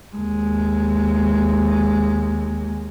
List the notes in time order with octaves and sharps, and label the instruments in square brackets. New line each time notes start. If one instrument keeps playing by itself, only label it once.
[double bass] D#2 G#3